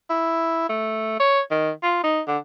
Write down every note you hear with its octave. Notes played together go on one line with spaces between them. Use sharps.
E4
A3
C#5
D#3
F4
D#4
D3